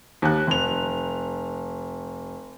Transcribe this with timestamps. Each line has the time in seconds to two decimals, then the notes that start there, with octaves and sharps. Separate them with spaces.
0.22 D#2 F#6
0.47 F1 F7